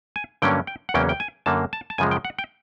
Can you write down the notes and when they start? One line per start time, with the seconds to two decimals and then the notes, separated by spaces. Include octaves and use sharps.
0.16 G#5
0.42 G2 D3 F#3 A#3 C#4 G5
0.67 G5
0.89 F#5
0.94 E2 C#3 F#3 A#3 C#4 G5
1.09 G5
1.20 G#5
1.46 F#2 D3 F#3 A#3 A5
1.73 A5
1.90 A5
1.98 F#2 C#3 F3 G#3 G#5
2.11 G5
2.25 F#5
2.39 G5